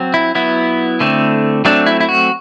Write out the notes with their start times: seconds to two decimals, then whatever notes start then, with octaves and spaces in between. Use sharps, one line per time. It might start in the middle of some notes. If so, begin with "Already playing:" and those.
Already playing: F#3 C4
0.14 E4
0.35 F#3 B3 E4
1.00 D3 A3 C4
1.65 F#3 A3 C4 D4
1.86 E4
2.01 E4
2.09 F#4